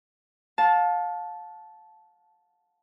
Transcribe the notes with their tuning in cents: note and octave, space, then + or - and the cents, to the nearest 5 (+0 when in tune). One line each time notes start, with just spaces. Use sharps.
F5 +30 A5 -10